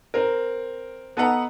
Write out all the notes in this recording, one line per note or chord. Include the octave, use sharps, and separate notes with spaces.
C4 A#4
B3 A4 B4 D#5 F#5 A#5